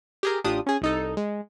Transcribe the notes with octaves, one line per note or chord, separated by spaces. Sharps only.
G4 G#4 A#4
A1 D4 F4 G4 D#6
C#4 G#4
C2 D#4 A4
G#3